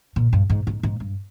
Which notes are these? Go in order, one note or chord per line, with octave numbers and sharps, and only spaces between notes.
A#2
G2
G#2
G#2
G#2
G2